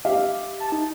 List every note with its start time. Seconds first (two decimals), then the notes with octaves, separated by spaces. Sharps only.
0.05 G4 E5 F5
0.60 A5
0.72 D#4